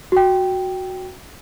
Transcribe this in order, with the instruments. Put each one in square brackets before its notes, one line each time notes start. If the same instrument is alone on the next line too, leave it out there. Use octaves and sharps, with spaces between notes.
[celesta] F#4 G5